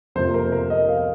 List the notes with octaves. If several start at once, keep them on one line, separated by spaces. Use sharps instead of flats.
F2 C3 F3 A#3 C5
A#4
A#4
D#5
F5